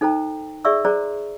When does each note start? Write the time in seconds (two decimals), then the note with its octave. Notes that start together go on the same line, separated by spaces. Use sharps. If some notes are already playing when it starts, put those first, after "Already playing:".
0.01 D#4 A4 C5 G5 A#5
0.65 G#4 D5 E5 C#6 E6
0.85 G#4 C5 D5 A#5